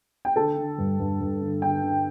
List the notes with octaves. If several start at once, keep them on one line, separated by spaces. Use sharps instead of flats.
G5
D3 A4 A5
D3
G2
G2
G2
D3
D3 G5
D3